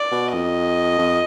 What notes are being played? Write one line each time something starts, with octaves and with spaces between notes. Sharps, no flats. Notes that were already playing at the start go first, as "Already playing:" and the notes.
Already playing: D5
B2
F2 D#5
F2